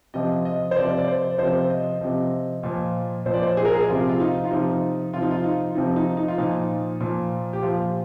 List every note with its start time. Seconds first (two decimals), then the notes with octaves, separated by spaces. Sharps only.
0.14 C3 F3 D#5
0.45 D#5
0.71 C5
0.76 C3 F3 D5
0.97 D5
1.07 C5
1.38 C3 F3 C5
1.70 D#5
2.01 C3 F3
2.63 A#2 F3
3.26 A#2 F3 C5
3.34 D5
3.43 C5
3.57 G#4
3.65 A#4
3.73 G#4
3.89 C3 F3 F4
4.09 F4
4.20 D#4
4.45 F4
4.51 C3 F3 D#4
5.14 C3 F3 F4
5.22 D#4
5.31 F4
5.44 D#4
5.75 C3 F3 D#4
5.96 D#4
6.17 D#4
6.28 F4
6.38 A#2 F3 D#4
7.00 A#2 F3
7.53 G4
7.62 A#2 F3 F4